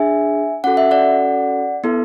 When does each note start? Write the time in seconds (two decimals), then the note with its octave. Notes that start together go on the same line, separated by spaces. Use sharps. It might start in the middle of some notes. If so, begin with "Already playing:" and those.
Already playing: D4 G#4 E5 G#5
0.64 C#4 F#4 A4 F#5
0.77 E5
0.91 D5 F#5
1.84 B3 E4 A4